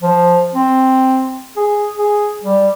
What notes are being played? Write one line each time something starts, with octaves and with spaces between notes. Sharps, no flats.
F3
C4
G#4
G#4
G3